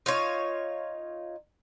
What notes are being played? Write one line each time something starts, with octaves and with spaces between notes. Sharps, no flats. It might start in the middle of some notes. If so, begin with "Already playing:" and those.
D#4 F4 C#5